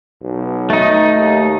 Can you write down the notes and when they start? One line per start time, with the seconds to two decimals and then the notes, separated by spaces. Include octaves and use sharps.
0.22 B1
0.70 A3 D#4
1.17 D#2